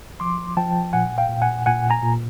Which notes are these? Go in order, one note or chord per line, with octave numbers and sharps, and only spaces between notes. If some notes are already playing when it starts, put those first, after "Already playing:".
F3 C6 D6
F3 G5 A5
A#2 F#5 G#5
F5 G5
A#2
F#5 G#5
A#2 F#5 G#5
G#5 A#5
A#2